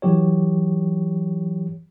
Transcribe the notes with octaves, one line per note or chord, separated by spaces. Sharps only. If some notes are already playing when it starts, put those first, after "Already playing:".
E3 F#3 G4 C#5